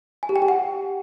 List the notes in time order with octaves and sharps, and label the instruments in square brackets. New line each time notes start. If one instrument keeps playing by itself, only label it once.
[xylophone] G#5
G4
G5
G4
F#5